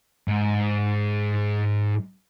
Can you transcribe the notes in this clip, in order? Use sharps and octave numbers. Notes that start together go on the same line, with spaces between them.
G#2